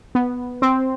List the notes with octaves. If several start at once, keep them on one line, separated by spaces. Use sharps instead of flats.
B3
C4